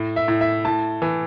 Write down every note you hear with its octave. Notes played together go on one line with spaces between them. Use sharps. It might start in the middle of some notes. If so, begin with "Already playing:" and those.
Already playing: A2
E5
A2
E5
A2 A5
E3